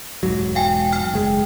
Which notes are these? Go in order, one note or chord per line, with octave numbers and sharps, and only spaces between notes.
E1 G#2 F#3
F5 G5 G#5
G5 F6
F#1 G#3